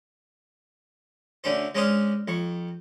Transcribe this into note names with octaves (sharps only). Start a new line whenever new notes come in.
D2 D3 C#4 C5
G#3 C#4 D4 C5 D#5 F5
F2 C#6